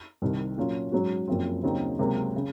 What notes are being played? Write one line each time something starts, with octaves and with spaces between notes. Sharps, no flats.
C2 C3 D#3
A#2 F#3 C#4 F4
G#2 F#3 C#4 F#4
F#1 F#2 F3 C4
D#2 C#3 F#3 C4 D#4
C#2 C3 F#3 A#3
C#3